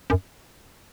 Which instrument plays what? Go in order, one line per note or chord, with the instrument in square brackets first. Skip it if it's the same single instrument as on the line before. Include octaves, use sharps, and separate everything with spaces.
[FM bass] F#2